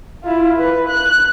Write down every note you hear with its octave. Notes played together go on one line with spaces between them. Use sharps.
E4 F4
B4
F#6